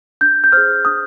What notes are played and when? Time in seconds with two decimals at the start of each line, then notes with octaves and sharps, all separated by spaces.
0.21 D4 G6
0.44 G6
0.52 G#4 C5 F6
0.85 D4 D#6